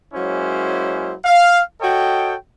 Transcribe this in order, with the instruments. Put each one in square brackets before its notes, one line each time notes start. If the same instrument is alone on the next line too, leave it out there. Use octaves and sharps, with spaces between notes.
[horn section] F#3 G#3 A#3 C#4 E4 C5
F5
F#4 A4 C#5 D#5 G5